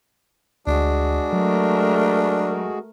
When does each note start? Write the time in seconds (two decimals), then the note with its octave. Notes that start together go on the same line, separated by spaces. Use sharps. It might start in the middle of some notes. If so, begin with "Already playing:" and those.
0.67 D2 G#3 D4 F#4 G#4
1.33 F#3 A3 A#4